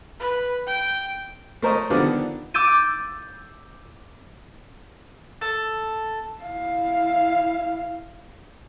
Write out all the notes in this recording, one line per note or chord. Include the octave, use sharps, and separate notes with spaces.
B4
G5
A3 A#4 C5 C#5 D#5
D3 D#3 F3 G3 B3 D4
D6 E6 G6 A6 D#7
A4
E4 F5